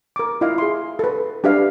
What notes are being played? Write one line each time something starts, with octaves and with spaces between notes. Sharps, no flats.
A#4 D6
E4 F4 D#5 F5
G#4 C6
A4 B4
D4 G4 B4 E5 F5